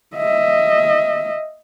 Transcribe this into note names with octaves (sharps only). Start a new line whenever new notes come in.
D#5 E5